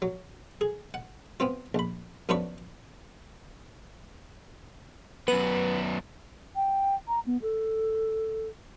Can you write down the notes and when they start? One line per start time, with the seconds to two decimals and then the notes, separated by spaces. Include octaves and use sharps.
0.02 F#3
0.61 G#4
0.94 F#5
1.40 B3 C4 F4
1.75 A#1 B5
2.29 F#2 F3 B3 D4 B4 C#6
5.28 F#2 B3 B4
6.56 G5
7.08 A#5
7.26 B3
7.42 A4